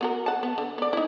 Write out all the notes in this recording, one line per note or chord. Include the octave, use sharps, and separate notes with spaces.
B3 F#4 A#4
F#5 A5
B3
D3
B3 D5
D#4 E4